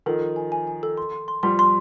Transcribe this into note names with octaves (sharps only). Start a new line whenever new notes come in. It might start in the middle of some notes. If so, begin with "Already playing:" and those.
D#3 F3 A4
A4
G#5
G#5
G#5
A4
C6
C6
C6
F3 G3 C6
C6